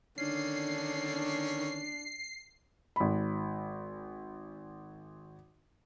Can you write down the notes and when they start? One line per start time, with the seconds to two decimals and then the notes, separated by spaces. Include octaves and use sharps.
0.18 D3 D#3 C#4 D4 C7
2.96 G#1 B5